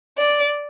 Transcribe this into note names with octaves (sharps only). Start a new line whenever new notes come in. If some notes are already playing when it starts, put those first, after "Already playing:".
D5